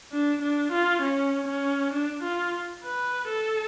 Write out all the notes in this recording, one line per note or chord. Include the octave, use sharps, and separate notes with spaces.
D4
D4
F4
C#4
C#4
D4
F4
B4
A4